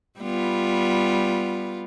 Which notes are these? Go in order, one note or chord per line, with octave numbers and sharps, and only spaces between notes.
G3 B3 F4